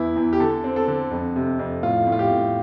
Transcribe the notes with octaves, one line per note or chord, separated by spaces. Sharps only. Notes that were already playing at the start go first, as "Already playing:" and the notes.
Already playing: E2 E3 E4
E2
G4
D3 A4
C4
A4
D3
F2
C3
F2
A2 F4
A2
F4
G4
A2